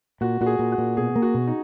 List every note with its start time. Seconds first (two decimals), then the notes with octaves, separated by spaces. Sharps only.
0.21 A#2 F#4
0.41 A#2 F#4
0.46 G#4
0.59 A#2
0.72 F#4
0.78 A#2
0.97 B2 G#4
1.16 A#3
1.22 F#4
1.34 B2
1.47 D#4